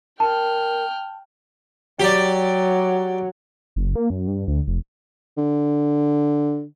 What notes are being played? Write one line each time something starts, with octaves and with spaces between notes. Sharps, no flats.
A#4 G5 A5 F6
F#3 G4 D5
F#1
A#3
F#2
G2
D2
F1
D3